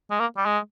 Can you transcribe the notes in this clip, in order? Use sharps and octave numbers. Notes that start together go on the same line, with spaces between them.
G#3
A#3
G3
G#3